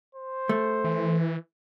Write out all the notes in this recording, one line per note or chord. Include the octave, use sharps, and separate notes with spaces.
C5
A3
E3